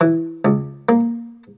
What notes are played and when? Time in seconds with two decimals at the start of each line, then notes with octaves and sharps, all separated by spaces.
0.01 E3
0.45 C#2
0.89 A#3